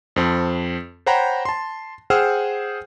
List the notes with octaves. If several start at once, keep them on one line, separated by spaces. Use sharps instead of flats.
F2 C4 A5
C5 C#5 F#5 G5 A#5 B5
A5 C6
G#4 C5 F#5 G5 E6 F6